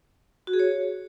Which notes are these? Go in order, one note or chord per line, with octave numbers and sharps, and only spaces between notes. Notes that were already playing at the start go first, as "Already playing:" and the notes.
F#4
G#4
C#5